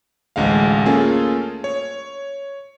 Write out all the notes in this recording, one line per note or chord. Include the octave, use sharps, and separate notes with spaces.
A1 D2 G#3 F5
A3 A#3 C#4 F4 G#4 A4
C#5